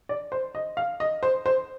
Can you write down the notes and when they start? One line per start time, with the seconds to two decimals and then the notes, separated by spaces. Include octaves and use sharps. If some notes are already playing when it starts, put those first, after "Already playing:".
0.09 D5
0.32 C5
0.55 D#5
0.77 F5
1.00 D#5
1.23 C5
1.46 C5